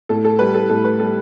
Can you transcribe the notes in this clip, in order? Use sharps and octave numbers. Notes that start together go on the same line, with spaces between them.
A2 A4
A4
G3 B4
A4
A2 A4
B4
G3 A4